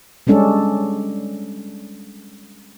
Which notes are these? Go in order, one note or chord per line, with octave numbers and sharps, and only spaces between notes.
G3 G#3 C#4 D4 A4